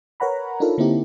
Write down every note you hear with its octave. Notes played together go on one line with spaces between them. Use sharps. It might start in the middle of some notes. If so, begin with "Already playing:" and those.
A#4 B4 C#5 F#5 A#5 B5
D4 D#4 F4 A4 A#4
D3 A#3 C4 D#4 E4 G4